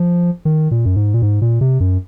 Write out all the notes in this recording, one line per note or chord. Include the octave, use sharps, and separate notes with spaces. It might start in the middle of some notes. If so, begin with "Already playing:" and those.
Already playing: F3
D#3
A#2
F#2
G#2
A#2
G#2
A#2
C3
F#2